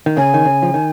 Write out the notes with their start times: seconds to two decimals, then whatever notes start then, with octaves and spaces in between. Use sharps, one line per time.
0.06 D#3
0.17 C#3 G#5
0.34 D#3
0.45 C#3
0.62 F3
0.74 D#3